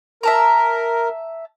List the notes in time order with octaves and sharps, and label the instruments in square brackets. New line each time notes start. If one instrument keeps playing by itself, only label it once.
[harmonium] A#4 [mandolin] E5 A5 A#5